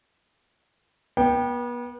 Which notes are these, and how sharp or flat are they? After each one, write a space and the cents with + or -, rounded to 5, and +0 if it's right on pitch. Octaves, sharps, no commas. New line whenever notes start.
B3 -35 G5 +0